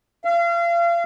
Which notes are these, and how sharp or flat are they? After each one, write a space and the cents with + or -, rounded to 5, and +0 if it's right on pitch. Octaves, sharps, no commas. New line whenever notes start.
F5 -35